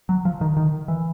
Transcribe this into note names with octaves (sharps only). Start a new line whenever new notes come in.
F#3
F3
D#3
D#3
E3